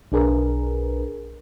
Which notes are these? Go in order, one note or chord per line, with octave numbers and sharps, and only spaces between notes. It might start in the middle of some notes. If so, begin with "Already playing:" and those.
B1 D4 G#4 A#4 B4